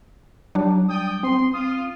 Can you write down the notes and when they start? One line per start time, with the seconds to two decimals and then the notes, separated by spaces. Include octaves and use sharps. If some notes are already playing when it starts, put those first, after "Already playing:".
0.55 F#3 G3 D4
0.89 D5 G5 D#6
1.23 C4 C6
1.53 F4 D#6